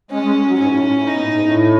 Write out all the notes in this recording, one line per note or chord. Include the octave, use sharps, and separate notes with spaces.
G#3 C#4
G#3
F#3
G#2 C#4
A2
A2
A2
B2 D#4
A2
G#2
A2